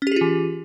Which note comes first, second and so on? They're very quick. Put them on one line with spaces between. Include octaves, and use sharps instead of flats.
C#4 G4 G#4 F4 E3